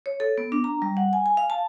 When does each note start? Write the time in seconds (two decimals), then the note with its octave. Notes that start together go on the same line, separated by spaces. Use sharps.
0.06 C#5
0.20 A4
0.38 B3
0.52 D4
0.64 A#5
0.82 G3
0.97 F#5
1.13 G#5
1.26 G#5
1.37 F5
1.50 A5